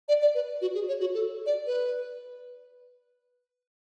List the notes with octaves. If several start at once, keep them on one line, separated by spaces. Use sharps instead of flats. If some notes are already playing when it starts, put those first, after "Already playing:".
D5
D5
B4
F#4
G#4
C#5
F#4
A4
D5
B4